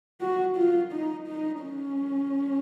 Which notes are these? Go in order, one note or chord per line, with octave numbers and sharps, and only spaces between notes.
F#4
F4
D#4
D#4
C#4